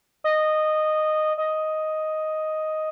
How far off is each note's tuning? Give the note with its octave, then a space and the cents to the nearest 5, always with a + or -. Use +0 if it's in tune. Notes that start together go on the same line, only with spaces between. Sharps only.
D#5 -10
D#5 +5